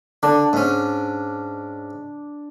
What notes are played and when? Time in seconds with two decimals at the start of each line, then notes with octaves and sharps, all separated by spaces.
0.23 D3 D4
0.53 G#2 C#4